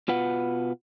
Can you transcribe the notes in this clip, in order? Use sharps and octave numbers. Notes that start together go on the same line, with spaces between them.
B2 F4 B4 F#5